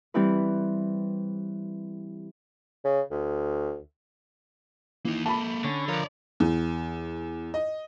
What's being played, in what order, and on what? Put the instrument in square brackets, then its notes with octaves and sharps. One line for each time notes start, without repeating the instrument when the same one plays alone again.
[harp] E3 G3 C4 E4 B4
[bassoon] C#3
D2
[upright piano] E3 [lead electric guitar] A#3 D#4
[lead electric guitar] A#3 A4 [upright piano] A5 B5
[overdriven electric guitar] D3 [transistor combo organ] C#4
[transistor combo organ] F3 A#4 [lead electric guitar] C#5 D5
[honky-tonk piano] E2
D#5